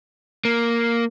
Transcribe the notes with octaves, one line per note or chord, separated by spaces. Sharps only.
A#3